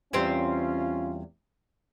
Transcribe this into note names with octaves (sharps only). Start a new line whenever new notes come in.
E2 G3 C4 C#4 F4